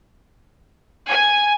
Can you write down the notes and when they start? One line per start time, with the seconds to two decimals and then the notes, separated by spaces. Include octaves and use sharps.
1.08 G#5